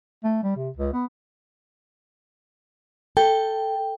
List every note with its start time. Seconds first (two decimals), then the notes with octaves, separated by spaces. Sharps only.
0.24 A3
0.44 G3
0.56 C3
0.76 C#2
0.93 B3
3.17 A4 G5